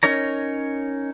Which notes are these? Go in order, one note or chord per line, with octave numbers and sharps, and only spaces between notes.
C#4 D#4 A#4 C#5 A#5